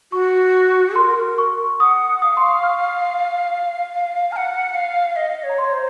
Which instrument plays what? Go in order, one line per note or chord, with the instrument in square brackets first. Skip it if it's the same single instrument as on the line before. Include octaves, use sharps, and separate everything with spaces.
[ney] F#4 [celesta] C#6
[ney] A#4 [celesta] C6
[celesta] C#6
[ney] F#5 [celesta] D#6
[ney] F5 [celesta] D#6
[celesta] C6
C#6
F6
[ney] F#5 A#5 [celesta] F6
[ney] F5
D#5
C#5
[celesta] A#5
[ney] C#5 [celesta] C6
[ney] C5